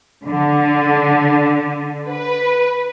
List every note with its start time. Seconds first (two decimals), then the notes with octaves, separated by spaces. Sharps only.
0.25 D3
2.09 B4